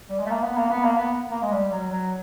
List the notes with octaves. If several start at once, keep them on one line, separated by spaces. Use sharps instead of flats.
G3
G#3
A3
A#3
B3
A#3
B3
A#3
B3
A#3
G#3
G3
F#3
F#3